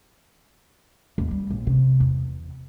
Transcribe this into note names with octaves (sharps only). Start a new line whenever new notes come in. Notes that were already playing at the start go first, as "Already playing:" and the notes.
D#2
G3
A#1
C3
E2